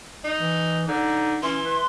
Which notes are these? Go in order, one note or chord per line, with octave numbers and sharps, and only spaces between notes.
D#4
E3
D3 D#4
E3 C#4 C6
B4